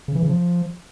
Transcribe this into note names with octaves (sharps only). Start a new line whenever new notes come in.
C#3
E3
C#3
F3